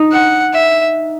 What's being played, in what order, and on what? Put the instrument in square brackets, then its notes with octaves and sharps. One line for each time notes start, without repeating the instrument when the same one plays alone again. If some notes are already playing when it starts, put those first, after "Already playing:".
Already playing: [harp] D#4
[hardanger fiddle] F#5
E5